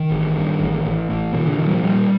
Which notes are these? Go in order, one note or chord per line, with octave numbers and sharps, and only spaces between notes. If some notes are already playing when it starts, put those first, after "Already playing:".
Already playing: D#3
A1
G2
A1
A1
A1
A#2 D#3
D3
A#2 D#3
G3
F3
A#2 G3